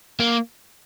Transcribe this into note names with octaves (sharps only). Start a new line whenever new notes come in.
A#3